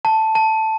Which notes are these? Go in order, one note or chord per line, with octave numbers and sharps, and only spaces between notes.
A5
A5